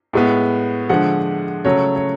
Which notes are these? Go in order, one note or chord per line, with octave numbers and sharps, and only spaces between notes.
A2 G#3 B3
D3 F3 G#3 F#5
C#3 F#3 A3 C#5
C#5